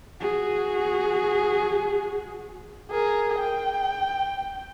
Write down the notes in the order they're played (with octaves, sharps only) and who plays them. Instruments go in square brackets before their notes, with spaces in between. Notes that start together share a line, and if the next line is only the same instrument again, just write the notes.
[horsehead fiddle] F#4 G#4
[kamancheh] G#4 A#4
G5